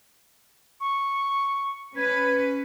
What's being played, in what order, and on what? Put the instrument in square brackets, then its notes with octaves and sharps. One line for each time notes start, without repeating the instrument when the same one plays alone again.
[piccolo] C#6
[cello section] C#4 B4 [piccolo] G#6